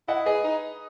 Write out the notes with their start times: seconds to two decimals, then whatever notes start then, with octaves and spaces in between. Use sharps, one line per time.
0.08 E4 D#5 F#5
0.26 G#4 B4 D#5
0.44 D#4